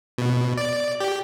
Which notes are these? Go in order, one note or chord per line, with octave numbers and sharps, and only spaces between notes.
B2
D5
G4